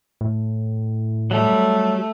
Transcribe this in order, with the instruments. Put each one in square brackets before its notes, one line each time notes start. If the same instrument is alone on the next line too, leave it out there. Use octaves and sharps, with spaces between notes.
[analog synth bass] A2
[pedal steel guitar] F#3 G3 [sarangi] A3